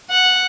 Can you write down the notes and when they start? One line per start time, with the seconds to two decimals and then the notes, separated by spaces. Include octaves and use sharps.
0.10 F#5